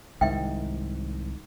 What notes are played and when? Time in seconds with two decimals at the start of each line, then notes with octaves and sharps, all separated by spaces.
0.21 C2 G#2 D#3 E5 G5